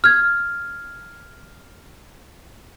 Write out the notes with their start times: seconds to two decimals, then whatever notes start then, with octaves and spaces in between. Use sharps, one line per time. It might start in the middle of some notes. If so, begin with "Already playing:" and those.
0.04 F6 G#6